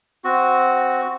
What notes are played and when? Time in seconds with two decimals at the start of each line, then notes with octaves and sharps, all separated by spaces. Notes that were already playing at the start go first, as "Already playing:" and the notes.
0.24 C4 F#4